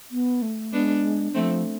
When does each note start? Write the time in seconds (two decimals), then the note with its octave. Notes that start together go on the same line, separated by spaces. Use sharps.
0.11 B3
0.42 A3
0.73 G#3 B3 D4
1.34 F3 A3 C4